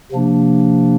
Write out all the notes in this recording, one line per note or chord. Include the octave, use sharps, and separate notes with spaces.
C3 F3 A#3 D4